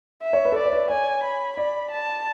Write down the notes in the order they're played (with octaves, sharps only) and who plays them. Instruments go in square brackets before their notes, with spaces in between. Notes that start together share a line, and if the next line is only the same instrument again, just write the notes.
[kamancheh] E5
[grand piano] C#5
B4
A4
[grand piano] B4 [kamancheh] D5
[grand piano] C#5
B4
[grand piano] C#5 [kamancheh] G#5
[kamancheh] B5
[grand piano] D5 [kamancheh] B5
[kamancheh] A5